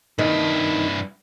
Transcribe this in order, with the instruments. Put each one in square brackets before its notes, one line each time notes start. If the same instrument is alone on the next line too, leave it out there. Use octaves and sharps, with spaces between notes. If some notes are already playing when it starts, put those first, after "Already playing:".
[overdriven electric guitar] G2 E4 [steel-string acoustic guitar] D#3